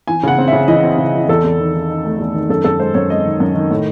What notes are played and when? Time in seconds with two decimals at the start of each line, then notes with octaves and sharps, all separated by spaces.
0.07 E3 G#5
0.23 C#3 F#5
0.38 C4
0.48 E5
0.53 C#3
0.68 E3 D#5
0.83 C4
0.98 C#3
1.14 E3
1.29 E2 A4
1.44 E2
1.59 D#3
1.74 D#3
1.90 D#4
2.05 A3
2.19 E2
2.34 D#3
2.49 F#2 A4
2.64 F#2 A4
2.79 G#3 C5
2.94 F#2 C#5
3.10 G#3 D#5
3.25 D#3
3.40 F#2
3.55 D#3
3.71 A2